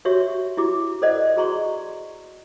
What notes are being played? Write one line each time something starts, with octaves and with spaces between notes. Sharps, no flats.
F#4 G4 C#5 E5 C#6
E4 F#4 G4 D6
A4 C5 D5 D#5 F#5
F#4 G#4 A#5 C6 C#6